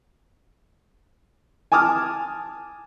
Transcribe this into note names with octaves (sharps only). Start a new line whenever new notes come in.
G#5 A5 D6 D#6 F6